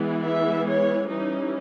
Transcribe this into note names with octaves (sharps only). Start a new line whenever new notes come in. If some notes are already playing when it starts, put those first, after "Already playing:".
Already playing: E3 G#3 B3
E5
C#5
E3 G3 C#4 D#4